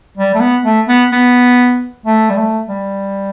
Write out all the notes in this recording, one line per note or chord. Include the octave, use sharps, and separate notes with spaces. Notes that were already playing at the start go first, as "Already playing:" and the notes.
G3
A3
B3
A3
B3
B3
A3
G3
A3
G3